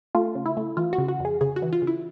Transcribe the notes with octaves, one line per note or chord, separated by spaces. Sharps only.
A3 F4
C#3
E4
A3
E3 F4
F#4
C#3
F#4
F2 G#4
C#3 G#4
F#4
E3
F4
C#3
E4